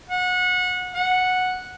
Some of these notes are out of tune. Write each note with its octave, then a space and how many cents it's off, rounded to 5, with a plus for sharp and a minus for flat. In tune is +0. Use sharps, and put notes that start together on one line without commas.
F#5 -25
F#5 -10